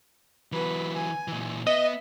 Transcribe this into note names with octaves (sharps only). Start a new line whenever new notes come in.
E3 F#3 B3 B4
G#5
A#2 E3
B3 D#5 E5